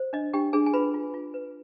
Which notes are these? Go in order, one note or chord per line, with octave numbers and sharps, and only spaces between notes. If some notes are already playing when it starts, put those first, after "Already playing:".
Already playing: C5
D4 D#5
D4 G4 G5
D4 G#4 G#5
G#5
F4 B4 B5
F4
F4
B4